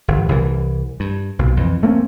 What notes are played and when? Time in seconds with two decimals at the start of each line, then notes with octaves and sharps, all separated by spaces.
0.08 G1 E3
0.29 C2 E3
1.00 G2
1.39 B1 A#2
1.57 F2 E3
1.83 A3 A#3 C4 C#4